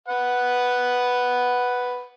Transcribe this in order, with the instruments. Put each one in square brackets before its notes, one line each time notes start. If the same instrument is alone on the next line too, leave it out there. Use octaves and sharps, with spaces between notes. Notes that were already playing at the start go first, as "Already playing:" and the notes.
[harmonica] B4 F#5